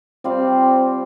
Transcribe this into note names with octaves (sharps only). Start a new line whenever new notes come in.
G3 C4 F4 D5